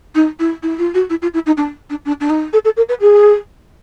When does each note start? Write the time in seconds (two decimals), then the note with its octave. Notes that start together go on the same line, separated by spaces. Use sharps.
0.15 D#4
0.39 E4
0.62 E4
0.78 F4
0.94 F#4
1.10 E4
1.22 F4
1.34 E4
1.46 D#4
1.57 D4
1.90 D4
2.05 D4
2.20 D4
2.29 D#4
2.53 A4
2.64 A4
2.76 A#4
2.89 B4
3.01 G#4